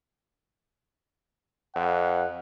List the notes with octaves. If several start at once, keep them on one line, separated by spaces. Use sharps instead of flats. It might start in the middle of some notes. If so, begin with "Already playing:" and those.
F2 F#5